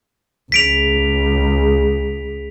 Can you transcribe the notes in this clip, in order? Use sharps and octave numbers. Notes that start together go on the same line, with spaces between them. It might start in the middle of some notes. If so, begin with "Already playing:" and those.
C#2 B6 D7 F7